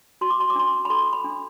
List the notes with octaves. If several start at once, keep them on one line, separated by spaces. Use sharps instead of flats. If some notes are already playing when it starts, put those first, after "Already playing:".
F#4 C6
D6
C6
D6
D4 C6
B5
A4 C6
B5
D4